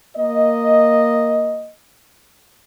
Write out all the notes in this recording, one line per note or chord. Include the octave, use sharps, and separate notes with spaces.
A#3 D#5